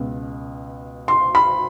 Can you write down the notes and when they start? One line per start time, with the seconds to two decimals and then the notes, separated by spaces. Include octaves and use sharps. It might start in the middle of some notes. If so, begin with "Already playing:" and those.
Already playing: C#2 B2
1.08 C6
1.35 B5